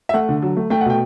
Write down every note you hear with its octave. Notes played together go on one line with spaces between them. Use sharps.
E5
A3 F#5
D3
F#3
A3
A3 G5
F#5
B2 G5